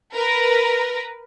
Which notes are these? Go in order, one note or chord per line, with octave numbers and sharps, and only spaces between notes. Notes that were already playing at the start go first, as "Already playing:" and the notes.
A#4 B4